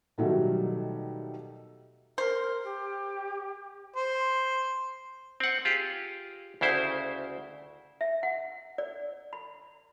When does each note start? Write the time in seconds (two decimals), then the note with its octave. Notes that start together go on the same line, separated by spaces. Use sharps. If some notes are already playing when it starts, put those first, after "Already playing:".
0.18 B2 D#3 F#3 G3 A3
2.18 A#4 C5
2.63 G4
3.96 C5
5.40 C4 F#5
5.65 F4 G4 G#4
6.61 D2 C#3 E4 C5
8.01 E5
8.23 F#5
8.78 D5
9.33 B5